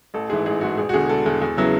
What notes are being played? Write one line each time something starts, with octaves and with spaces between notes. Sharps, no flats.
A1 A4
G#2 E3 G#4
A1 G#4
G#2 E3 F#4
E1 G#4
F#4
E2 D3 G#4
E1 A4
E2 D3
E2
C#3 F#3 B3 E4